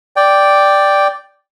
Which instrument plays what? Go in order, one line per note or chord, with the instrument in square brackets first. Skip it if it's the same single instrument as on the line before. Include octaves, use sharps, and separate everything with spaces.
[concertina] D5 G5